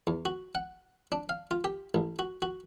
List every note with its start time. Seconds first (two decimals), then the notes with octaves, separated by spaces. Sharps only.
0.07 E2
0.25 F#4
0.55 F#5
1.12 D4
1.29 F5
1.51 F4
1.64 G4
1.94 A1
2.19 F#4
2.42 F#4